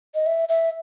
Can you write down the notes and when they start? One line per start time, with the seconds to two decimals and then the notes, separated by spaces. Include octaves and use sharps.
0.15 D#5
0.26 E5
0.49 E5